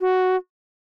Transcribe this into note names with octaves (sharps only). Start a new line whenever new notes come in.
F#4